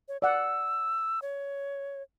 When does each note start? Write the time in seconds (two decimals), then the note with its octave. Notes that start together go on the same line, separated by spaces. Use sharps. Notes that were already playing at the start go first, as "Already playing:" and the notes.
0.08 C#5
0.22 D5 F#5 E6
1.22 C#5